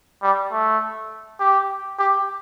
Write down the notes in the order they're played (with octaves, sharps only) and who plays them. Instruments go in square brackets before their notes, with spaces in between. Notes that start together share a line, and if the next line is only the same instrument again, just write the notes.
[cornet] G3
A3
G4
G4